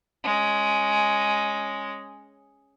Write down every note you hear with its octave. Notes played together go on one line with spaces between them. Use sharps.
G#3 C#4